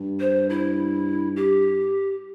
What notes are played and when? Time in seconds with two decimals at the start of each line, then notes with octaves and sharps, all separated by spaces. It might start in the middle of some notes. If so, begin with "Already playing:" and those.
Already playing: G2
0.20 C5
0.50 E4
1.36 G4